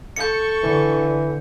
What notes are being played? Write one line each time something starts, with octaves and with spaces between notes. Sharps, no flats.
A4 C#6 G6 C#7
D3 E3